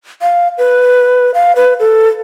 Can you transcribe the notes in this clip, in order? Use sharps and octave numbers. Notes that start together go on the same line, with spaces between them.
F5
B4
F5
B4
A4